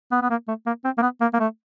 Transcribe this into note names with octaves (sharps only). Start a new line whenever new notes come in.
B3
B3
A#3
A3
A#3
C4
A#3
B3
A#3
A#3
A3